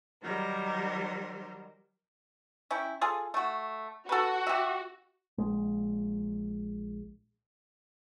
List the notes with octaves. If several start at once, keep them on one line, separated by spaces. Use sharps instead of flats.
D#3 F#3 G3 A#4 C5
C#4 E4 G5
F4 G#4 A4
A3 F#4
F#4 A4 B4
G4 E5
A#1 G#3